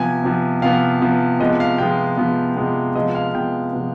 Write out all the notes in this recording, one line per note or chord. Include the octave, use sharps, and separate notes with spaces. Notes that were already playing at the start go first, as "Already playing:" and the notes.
Already playing: C3 F3 B3 G#5
C3 F3 B3
C3 F3 B3 F5
C3 F3 B3
C3 F3 G#3 B3 D#5
F5
C3 F3 G#3 B3 G5
C3 F3 G#3 B3
C3 F3 G#3 B3
C3 F3 G#3 B3 D#5
F5
C3 F3 G#3 B3 G5
C3 F3 G#3 B3